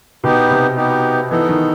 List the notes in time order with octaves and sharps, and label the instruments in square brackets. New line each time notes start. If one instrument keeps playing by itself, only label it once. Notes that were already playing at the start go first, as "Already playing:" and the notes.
[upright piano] B2 [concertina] B3 D#4 G4
[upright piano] C3
[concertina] B3 D#4 G4
[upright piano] E3 [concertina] B3 D#4 A4
[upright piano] D#3